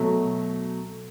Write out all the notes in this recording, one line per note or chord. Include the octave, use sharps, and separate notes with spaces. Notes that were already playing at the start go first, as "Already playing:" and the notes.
Already playing: B2 F#3 A3